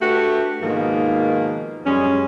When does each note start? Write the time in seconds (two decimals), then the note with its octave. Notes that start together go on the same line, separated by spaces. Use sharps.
0.02 A3 D4 F#4 G4 B4
0.62 G#2 B2 D#3 F3 A#3
1.86 F#2 G3 G#3 C#4